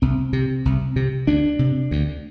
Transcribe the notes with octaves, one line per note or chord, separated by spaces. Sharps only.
C2 C4
C3
C2
C3
D2 D4
C3
D2